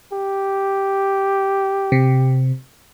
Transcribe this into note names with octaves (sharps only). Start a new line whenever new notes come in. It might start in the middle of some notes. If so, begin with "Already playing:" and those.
G4
C3